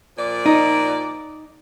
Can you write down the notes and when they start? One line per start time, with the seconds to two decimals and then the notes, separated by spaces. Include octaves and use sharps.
0.18 A#2 F3 D5
0.46 D#4